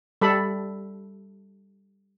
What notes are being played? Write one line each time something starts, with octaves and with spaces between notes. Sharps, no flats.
G3 A4 B5